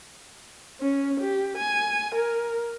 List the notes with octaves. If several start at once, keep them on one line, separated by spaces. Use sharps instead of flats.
C#4
G4
G#5
A#4